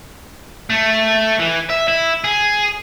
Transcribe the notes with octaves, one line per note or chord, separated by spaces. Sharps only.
A3
E3
E5
E4
G#4